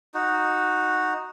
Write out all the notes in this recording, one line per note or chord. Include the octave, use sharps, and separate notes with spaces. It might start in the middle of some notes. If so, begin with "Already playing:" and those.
D#4 F#4